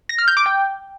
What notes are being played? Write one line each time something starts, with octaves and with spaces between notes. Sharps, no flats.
A#6
F6
G6
D6
G5